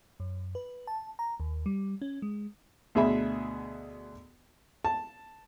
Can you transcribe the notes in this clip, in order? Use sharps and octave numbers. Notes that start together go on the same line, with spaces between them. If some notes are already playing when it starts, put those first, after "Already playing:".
F#2
B4
A5
A#5
D#2
G3
C#4
G#3
D2 B2 G#4 E5 B5
A5